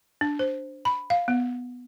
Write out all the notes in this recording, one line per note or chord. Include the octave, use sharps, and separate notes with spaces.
D4
C5
B5
F5
B3